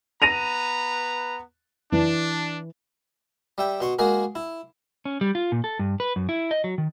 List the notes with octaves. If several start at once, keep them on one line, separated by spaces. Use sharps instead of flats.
B3 B4 A#5 A#6 D#7 F7
E3 D4
G3 E5 G5
B2 C6 C#6
G#3 A#3 F#4 G#4 A#4
E4
C#4
G3
F4
A#2
A4
G2
B4
F#2
E4
D#5
F#3
D#3